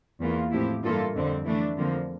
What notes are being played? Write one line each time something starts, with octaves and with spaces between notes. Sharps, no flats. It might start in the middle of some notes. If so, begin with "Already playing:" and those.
E2 E3 A#3 F4
A2 F3 C4 E4 G4
G2 E3 A#3 F4 A4
F2 D3 G3 C4
E3 A3 D4
F2 D3 F3 A#3